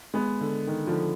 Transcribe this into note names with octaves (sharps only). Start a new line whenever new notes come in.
G#3 B3
D3
D#3
D3 F3